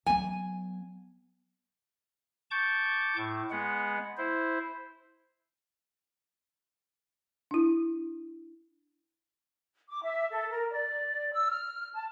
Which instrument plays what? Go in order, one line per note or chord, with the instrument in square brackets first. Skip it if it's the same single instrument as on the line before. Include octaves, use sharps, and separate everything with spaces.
[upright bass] F#3 B3 [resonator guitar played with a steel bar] G#5
[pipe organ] A5 C#6 D6 G6
A2
G#3 B3 F#5
E4 C5
[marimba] D4 E4
[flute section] D6
E5
A4
A#4
D5
E6
F6
A5